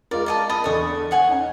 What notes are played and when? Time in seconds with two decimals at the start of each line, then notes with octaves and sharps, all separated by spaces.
0.11 G#3 F4 A#4 D5
0.26 D5 D#5 A5
0.49 D#5 B5 D#6 A6
0.64 E2 D4 A4 C#6 D#6
1.11 C#5 F#5 G#5
1.29 C#4 D#4